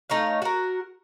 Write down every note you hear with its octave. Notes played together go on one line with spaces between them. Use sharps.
A3 D#4 C#5 F5
F#4 A#4